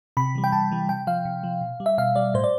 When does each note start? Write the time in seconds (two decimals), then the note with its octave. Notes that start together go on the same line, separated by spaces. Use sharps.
0.17 C3 B5
0.35 E3 G3
0.44 G5
0.52 C3 A5
0.71 E3 G3
0.89 C3 G5
1.07 F3 F5
1.25 C3
1.43 F3
1.61 B2
1.80 G3
1.86 E5
1.98 B2 F5
2.16 G3 D5
2.34 A2 C5
2.44 D5